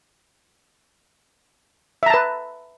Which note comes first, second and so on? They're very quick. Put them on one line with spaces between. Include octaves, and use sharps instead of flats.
E5 A#5 A5 B4